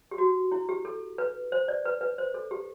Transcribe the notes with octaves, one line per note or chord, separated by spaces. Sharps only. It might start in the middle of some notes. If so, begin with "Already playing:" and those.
G4
F#4
E4
G4
A4
B4
C5
D5
B4
B4
C5
A4
G4